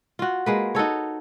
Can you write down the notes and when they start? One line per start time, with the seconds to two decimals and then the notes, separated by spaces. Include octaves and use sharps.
0.19 F4 F#4
0.46 G#3 A#3 B4
0.75 D#4 F#4 A4 C#5